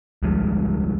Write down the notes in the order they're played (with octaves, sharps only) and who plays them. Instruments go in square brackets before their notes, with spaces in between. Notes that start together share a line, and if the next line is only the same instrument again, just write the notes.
[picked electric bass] D2 F3 G3 G#3